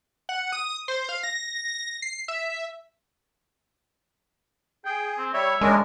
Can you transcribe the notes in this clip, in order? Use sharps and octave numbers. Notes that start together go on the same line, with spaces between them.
F#5
D#6
C5
F5
A#6
C7
E5
G#4 G5
C4
G3 C#5 E5
G#3 C#4 D4 A#4